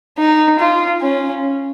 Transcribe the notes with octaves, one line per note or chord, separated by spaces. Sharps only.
D#4
F4
C#4